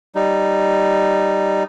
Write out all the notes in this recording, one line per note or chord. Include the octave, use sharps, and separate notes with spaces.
G3 D#4